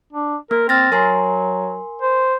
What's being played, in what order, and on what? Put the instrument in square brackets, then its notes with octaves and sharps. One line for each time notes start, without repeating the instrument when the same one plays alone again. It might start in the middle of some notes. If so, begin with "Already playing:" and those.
[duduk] D4
[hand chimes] A#3 [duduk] A#4
[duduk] C4 [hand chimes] F6 A6 A#6
[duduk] F#3 [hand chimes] A#4 G#5 C6
[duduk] C5